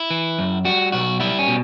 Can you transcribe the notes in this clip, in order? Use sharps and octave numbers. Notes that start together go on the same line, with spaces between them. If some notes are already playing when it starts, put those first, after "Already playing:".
Already playing: E4
E3
F#2
G3 F#4
B1 F#4
G3 E4
C#4
B2